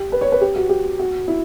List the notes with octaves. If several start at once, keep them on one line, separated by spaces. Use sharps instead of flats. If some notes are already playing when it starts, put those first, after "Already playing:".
Already playing: G4
B4
C#5
B4
G4
F#4
G4
F#4
E4